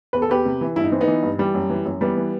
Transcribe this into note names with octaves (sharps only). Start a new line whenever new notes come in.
E2 B4
A4
E2 G4 B4
C3
E3
G2 E4
D#4
E3 C4
B3 D#4
E3
G2
E3 G3
F#2
E3
F#2
E3 G3 B3
E3